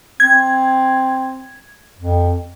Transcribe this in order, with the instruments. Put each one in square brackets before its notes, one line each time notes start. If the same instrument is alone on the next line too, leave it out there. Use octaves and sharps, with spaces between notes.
[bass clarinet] C4 [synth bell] G#6
[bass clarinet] F2